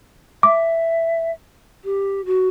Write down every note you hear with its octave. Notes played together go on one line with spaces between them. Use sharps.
E5 D6
G4
F#4